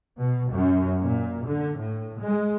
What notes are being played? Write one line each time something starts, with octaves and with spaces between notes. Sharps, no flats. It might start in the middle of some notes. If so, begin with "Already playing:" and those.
B2
F#2
A#2
D3
A2
G#3